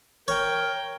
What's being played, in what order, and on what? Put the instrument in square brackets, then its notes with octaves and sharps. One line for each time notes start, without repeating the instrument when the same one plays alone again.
[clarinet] A#4 [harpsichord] C#5 [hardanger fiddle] G5